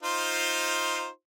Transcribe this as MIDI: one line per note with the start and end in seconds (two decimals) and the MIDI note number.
0.03 1.08 63
0.03 1.08 65
0.03 1.08 72